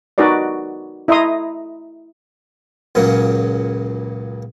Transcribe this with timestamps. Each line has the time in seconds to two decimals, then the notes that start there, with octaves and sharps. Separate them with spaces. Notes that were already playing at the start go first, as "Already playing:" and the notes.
0.18 D#4 F#4 B4 D5 D#5
1.08 E4 D#5 E5 A#5 C6 D#6
2.95 C#2 A#2 C#3 F#3 A#3 C#4